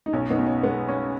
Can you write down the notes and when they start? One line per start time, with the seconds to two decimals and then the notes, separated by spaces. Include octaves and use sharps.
0.06 D#4
0.13 B1 C#4
0.30 B3 D#4
0.39 B2
0.46 C#4
0.63 G#3 B3
0.89 C#4